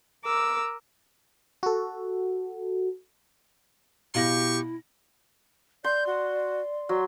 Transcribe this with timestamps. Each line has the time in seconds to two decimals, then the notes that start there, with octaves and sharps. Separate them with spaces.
0.25 A#4 D6 E6
1.63 F#4 A4
4.15 B2 E4 G4 F5 C#6 A#6
5.84 D5 C6 G6
6.07 F#4
6.89 F#3 C6